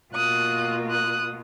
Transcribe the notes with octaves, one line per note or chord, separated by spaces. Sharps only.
B2 A#3 F4 D#6 F#6
D#6 F#6